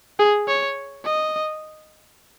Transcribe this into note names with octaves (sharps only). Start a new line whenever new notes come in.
G#4
C#5
D#5